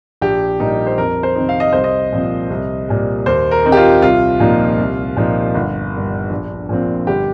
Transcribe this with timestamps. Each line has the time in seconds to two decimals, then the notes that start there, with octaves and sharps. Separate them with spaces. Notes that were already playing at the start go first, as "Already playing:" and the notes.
0.22 A#1 G4
0.60 A#2 G3 A#3 D#4
0.87 C5
0.98 F2 A#4
1.23 C5
1.35 C3 D#3 C4 D#4
1.49 F5
1.60 D#5
1.73 C2 C5
1.84 D#5
2.12 A#2 F3 C4
2.50 C2
2.88 A#2 G3
3.26 D#2 C5
3.51 A#4
3.64 D#3 C4 D#4
3.72 G4
3.77 F4
4.02 C2 F4
4.40 A#2 F3 A#3 D#4
4.79 C2
5.16 A#2 F3 D#4
5.55 G1
5.93 G2 D#3
6.31 A#1
6.69 A#2 F3 C4
7.07 G1 G4